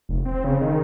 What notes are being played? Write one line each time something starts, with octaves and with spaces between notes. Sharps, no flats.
F1
C4
C#3
D#3